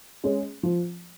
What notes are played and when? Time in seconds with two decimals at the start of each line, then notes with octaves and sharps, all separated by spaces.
0.24 G#3 C#4
0.63 F3